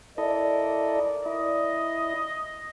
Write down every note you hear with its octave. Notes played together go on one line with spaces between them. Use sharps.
E4 A4 A#4 D5 D#5
E4 D#5